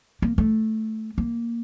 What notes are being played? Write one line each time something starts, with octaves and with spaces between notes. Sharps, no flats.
A#3
A3
A#3